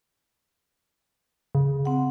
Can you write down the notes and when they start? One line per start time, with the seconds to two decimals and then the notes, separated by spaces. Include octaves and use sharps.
1.55 C#3
1.85 C4 F#5